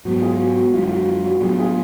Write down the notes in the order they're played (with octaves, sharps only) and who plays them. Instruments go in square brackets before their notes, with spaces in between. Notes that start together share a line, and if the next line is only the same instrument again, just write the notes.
[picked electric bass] G#2 F#3 B3 [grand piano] F#4
[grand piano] F4 G#4
F#4
F#4
[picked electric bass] F#2 D3 G#3 [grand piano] F4
[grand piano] F4
F#4
F4
F#4
[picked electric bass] A2 F#3 B3 D4 [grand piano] F4 G#4
[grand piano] F4 G#4